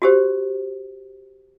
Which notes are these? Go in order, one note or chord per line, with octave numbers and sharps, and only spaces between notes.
F#4 G4 C5